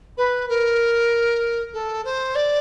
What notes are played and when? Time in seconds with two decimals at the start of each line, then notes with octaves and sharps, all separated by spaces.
0.17 B4
0.48 A#4
1.73 A4
2.04 C5
2.35 D5